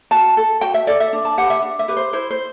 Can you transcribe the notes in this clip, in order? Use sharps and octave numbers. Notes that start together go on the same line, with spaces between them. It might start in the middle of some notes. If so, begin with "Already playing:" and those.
F#4 A5
A4
F#4 G5
E5
A4 D5
E5
D4
A5
G4 B4 F#5
E5
D4
E5
G4 B4
C5
E4 C5
C5